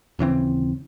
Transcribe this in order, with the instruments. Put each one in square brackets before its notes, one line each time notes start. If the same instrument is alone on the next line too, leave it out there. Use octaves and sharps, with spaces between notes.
[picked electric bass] D#1 C#3 E3 C4